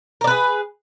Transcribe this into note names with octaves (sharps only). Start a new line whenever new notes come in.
G#4 A#4 B4 D5